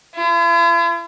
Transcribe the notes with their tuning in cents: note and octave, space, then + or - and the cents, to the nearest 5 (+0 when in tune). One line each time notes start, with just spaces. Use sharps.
E4 +45